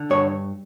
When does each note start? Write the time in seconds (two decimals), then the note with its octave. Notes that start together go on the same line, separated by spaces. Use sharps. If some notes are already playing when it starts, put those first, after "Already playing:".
Already playing: D3
0.10 G2 C#5